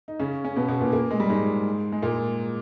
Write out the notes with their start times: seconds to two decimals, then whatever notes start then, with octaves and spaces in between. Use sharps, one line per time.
0.08 D#4
0.19 C#3 C#4
0.45 C#4
0.56 B2 B3
0.68 B2 B3
0.81 A#2 A#3
0.92 A#2 A#3
1.11 G#3
1.20 G3
1.30 G#2 G#3
1.92 G#3
2.02 A#2 A#3